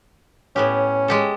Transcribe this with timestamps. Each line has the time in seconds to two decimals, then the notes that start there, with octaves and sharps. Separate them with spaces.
0.56 A2 B3 C#4 G4
1.08 G#3 G4 A4